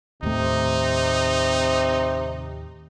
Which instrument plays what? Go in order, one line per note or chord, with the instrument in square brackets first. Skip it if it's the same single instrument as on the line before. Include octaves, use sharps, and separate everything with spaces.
[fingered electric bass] D#2 A2 A3 [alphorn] C3 [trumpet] D#4